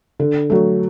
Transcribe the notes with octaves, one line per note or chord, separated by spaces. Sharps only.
D3
F#3 A3